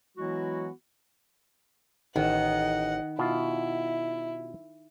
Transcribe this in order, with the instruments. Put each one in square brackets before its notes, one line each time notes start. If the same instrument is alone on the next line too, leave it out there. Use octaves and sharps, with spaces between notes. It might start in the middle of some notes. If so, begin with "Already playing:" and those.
[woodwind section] E3 F#3 G#3 B3 E4 F#4
[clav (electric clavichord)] A1 [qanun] D#3 [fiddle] D#5 F#5
[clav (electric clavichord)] B2 F4 [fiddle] E4